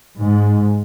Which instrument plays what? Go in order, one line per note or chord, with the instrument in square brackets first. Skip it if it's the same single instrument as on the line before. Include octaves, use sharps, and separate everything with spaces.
[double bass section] G#2